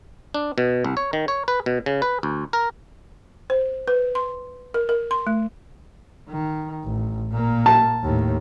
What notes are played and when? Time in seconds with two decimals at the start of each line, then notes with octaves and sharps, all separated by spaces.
0.34 D4
0.58 B2
0.84 C2
0.97 C#5
1.13 D#3
1.28 C#5
1.48 B4
1.66 B2
1.86 C#3
2.02 B4
2.23 D2
2.53 A#4
3.50 C5
3.88 B4
4.15 C6
4.74 A#4
4.89 A#4
5.11 C6
5.27 A3
6.29 D#3
6.84 A1
7.32 A#2 A#3
7.66 A5
8.03 D#2 A2